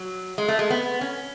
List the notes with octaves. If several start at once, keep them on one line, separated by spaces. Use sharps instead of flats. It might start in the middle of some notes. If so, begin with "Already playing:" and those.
Already playing: F#3
G#3
A3
G#3
B3
C#4